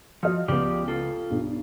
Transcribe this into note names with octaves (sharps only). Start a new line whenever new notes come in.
F3 F#4 D#5 F6
C#2 F3 B3 G4 D5
F4 A4
B1 G2